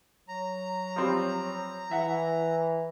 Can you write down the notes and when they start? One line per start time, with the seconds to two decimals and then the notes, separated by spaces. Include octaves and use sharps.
0.28 F#3 A#5
0.96 F3 G3 C4
1.91 E3 E5 F#5